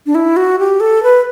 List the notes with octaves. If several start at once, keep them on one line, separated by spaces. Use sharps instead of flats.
D4
E4
F#4
G4
A4
B4